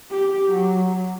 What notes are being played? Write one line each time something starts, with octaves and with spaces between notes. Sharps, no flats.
G4
F#3